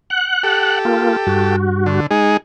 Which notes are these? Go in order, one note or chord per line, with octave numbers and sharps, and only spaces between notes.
F#5 F#6
G4 A4
A#3 F4
G2 F#4
D3
G#3 D#4 G#4